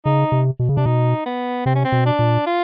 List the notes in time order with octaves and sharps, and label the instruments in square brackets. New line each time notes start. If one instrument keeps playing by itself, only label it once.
[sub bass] C#3 [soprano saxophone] D#4
[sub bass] C3
B2
C#3
[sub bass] C3 [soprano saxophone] D4
[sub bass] B2 [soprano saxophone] D#4
[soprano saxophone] B3
[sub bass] C3 [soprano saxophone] C4
[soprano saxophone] C#4
C4
[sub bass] B2
[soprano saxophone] D4
[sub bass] A#2
[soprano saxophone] F4